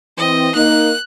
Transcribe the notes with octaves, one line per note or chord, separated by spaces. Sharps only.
E3 C4 D#5
A#3 D#4 F#6